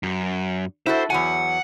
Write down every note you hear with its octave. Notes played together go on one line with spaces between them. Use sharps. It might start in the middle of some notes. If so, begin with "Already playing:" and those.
F#2
E4 F#4 A4 C5
E2 F#3 F#5 G#5